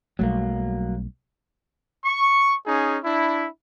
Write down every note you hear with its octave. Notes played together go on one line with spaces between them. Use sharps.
B1 F#3 G3 A3 A#3
C#6
C#4 D#4 G#4
D4 E4